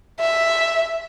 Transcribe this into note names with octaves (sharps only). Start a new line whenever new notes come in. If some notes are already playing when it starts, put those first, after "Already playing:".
E5